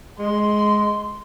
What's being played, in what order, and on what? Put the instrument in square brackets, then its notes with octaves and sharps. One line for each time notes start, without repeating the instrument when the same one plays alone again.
[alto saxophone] G#3 [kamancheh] C6